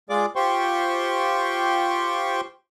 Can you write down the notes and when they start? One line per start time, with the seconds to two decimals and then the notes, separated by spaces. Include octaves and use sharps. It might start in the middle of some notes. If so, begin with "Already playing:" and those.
0.10 G#3 F4 G#4 D5 D6
0.36 F4 G4 C5 G5 C6 C#6